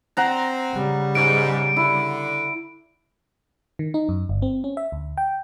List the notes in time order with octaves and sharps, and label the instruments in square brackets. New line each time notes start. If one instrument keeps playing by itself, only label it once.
[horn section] C4 [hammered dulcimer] F#5 A#5
[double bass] C#3 G3
[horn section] G#2 [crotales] D7
[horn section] D3 [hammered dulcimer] E4
[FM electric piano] D#3
D#4
F#2
G1
C4
C#4
E5
D2
G5